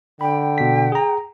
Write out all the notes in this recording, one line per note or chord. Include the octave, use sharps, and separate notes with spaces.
D3 G5 B5
B2 B6
G#4 A#5